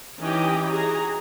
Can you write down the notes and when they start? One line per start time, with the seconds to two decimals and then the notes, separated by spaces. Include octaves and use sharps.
0.20 E3 C#4 D#4 G4 D#5
0.68 F#4 G#4 A#5